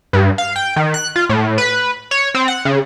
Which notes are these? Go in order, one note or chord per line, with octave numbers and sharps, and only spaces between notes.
G2
F5
G5
D#3
F#6
F4
A2
B4
C#5
C4
F#5
C#3